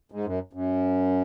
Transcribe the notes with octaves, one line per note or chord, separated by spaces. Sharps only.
G#2
F#2
F#2